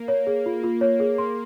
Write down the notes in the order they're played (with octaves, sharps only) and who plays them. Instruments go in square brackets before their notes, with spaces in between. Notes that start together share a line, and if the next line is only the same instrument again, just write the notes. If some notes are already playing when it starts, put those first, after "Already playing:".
Already playing: [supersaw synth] A#3
[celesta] C#5
G#4
F4
F4
C#5
G#4
C6